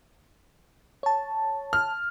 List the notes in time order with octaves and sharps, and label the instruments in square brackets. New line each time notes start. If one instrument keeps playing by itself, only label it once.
[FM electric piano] C#5 A5
[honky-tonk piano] F6